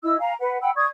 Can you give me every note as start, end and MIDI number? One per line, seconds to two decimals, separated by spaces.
0.03 0.16 64
0.03 0.16 75
0.03 0.16 88
0.18 0.32 77
0.18 0.32 80
0.18 0.32 82
0.39 0.57 71
0.39 0.57 78
0.61 0.70 78
0.61 0.70 79
0.61 0.70 83
0.61 0.70 88
0.75 0.85 74
0.75 0.85 85
0.75 0.85 87
0.75 0.85 92